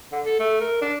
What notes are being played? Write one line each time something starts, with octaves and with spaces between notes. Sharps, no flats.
D3
A4
A3
A#4
D4